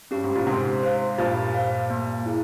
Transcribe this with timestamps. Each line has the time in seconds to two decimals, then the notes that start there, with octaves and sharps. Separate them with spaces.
0.11 G2 C#4 G4
0.24 G#2
0.35 A#2
0.46 G#2 C3 G4
0.83 C5 F5
1.18 G2 A#2 G4
1.54 C5 F5
1.90 A#3
2.26 E4 G#4